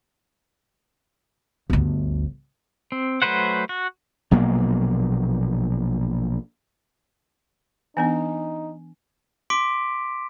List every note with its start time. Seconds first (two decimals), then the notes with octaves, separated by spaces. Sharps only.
1.70 G1 D2
2.92 C4
3.22 F#3 A3 B4 C5 F#5
3.69 F#4
4.31 A#1 B2 F#3 A#3
7.97 E3 B3 D4 D#4 G#5
9.50 C6 D6 B6 D7